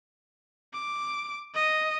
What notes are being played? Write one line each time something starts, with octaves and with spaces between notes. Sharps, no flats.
D6
D#5